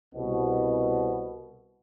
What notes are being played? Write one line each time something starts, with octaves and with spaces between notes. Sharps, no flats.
C2 B2